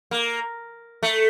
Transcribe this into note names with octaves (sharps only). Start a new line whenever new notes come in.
A#3
A3